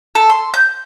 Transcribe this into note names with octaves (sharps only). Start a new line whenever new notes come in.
A4
C6
G6